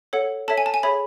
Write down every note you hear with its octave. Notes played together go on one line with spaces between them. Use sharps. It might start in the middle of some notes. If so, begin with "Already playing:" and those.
A4 C#5 F#5
A4 C#5 E5 A5
G#5
A5
G#5
G#4 C#5 E5 B5